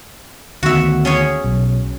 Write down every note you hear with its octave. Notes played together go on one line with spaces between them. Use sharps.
D2 D#3 B3 F#4 E5
C#4 G#4 C#5
B1